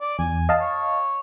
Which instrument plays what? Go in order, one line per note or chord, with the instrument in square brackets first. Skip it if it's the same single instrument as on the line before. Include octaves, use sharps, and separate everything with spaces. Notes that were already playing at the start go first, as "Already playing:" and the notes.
[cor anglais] D5
[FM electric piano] E2 [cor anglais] G#5
[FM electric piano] D#5 F5 A5
[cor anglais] C#5